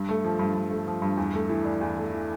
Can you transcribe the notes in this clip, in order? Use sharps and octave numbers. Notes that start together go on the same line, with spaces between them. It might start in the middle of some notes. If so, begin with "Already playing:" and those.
Already playing: G2
A3
F3
G2
G2
A3
F3
G2
E2
A3
E3
D4
E2
A3
E3